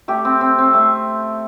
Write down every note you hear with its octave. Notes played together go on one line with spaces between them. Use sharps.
A3 G4
C4
C4
C4
A3